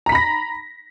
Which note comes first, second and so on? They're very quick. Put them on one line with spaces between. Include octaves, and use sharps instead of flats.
A#5 B6 B5 A#6